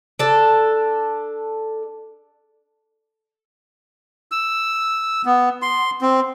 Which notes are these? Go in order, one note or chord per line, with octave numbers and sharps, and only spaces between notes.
D4 A4
E6
B3
C6
C4